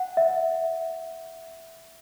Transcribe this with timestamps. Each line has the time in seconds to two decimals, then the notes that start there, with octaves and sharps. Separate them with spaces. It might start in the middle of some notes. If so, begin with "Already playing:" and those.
Already playing: F#5
0.17 E5